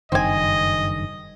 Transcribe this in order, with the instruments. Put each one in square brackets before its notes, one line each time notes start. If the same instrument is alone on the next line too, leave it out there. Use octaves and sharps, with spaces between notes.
[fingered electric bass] F#1 G2 D#3 [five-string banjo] C4 G#5 [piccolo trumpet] D#5